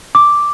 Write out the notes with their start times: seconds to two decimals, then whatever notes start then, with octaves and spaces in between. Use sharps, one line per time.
0.15 D6